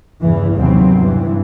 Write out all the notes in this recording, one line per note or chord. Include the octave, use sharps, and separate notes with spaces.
E2 G2 C#3 E3
D#2 C3 F#3 B3 C4
G2 E3